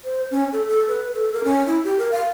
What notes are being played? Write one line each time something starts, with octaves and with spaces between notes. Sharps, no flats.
C5
C#4
A4
A4
B4
A4
A#4
C#4
E4
G4
A#4
F5